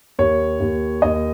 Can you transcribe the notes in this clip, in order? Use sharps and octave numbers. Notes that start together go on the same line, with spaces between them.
D#2 C#5
D#2
D#2 D#5